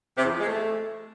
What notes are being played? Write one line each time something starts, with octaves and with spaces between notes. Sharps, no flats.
C3
E2
F3
G#3
A3